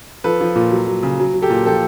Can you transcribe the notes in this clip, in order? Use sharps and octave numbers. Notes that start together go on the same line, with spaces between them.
F3 A4 B4
F3
A#2
F#3
F#3
C#3
F#3
F#3
G4 A4
A#2
F3 G4 A4